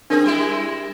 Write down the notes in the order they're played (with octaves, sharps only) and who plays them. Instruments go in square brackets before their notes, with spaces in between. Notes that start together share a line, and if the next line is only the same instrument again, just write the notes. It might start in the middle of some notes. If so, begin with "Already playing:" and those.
[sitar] C4 G#4 [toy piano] D4 A#4 C#5
[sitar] G3 G#3 E4